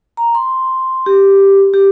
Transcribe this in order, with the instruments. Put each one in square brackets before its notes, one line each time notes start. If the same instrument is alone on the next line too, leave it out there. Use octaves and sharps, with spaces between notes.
[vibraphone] A#5
C6
G4
G4